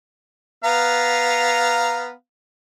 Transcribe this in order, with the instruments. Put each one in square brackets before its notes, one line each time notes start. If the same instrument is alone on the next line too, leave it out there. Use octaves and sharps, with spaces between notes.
[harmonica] B3 F5 A#5